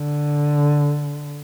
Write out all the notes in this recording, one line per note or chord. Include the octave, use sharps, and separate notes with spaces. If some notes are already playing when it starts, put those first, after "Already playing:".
Already playing: D3